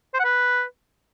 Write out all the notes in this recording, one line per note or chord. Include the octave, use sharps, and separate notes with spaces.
C5
F#5
B4